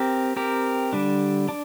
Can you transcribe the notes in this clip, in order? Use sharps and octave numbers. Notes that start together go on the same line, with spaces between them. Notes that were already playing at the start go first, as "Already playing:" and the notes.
Already playing: C4 G4 A#4
C4 G4 A#4
D3 G3 D4
D4